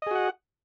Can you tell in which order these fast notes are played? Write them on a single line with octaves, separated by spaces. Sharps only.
D#5 G#4 F#4 F#5